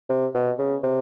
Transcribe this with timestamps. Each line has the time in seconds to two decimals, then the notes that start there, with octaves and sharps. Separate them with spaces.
0.09 C3
0.34 B2
0.59 C#3
0.83 C3